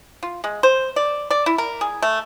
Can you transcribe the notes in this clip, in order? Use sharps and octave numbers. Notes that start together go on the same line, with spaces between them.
F4
G#3
C5
D5
D5
E4
A#4
G#4
A3